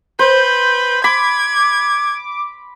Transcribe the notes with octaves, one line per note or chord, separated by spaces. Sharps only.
B4 C5 G6
B5 D6 G#6